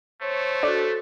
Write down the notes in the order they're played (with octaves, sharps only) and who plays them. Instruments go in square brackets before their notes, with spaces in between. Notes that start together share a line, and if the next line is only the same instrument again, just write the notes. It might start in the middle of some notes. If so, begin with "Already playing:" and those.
[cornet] A3 [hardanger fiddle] C5 C#5
[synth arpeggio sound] D4 [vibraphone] F#4 A4